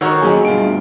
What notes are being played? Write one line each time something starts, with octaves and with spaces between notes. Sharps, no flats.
D#3 F#4 A4 C#5 A#5 E6
D#2 F#3 C#4 G#4 D#5
G2 B2 F4 D7
E5